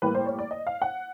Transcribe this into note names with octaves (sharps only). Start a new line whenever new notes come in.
A2 E3 G3 A#3 B4
C5
C#5
D5
D#5
F5
F#5